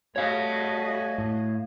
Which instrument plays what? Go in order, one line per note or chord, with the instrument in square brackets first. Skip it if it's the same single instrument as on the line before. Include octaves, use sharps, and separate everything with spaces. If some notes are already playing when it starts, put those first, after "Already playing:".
[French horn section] G3 A3 [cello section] F#4 D#5 [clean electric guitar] C#5 F5
[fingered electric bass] A2